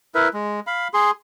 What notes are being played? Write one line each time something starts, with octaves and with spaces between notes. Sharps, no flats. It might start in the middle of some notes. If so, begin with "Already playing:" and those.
E4 A#4 B4 E5
G#3
F5 B5
G#4 C6